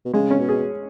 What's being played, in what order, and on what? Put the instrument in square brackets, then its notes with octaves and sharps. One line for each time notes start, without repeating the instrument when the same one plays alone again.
[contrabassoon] B2
[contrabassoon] C#3 [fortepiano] G#3
[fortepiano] C#4
[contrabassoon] B2
[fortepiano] G#4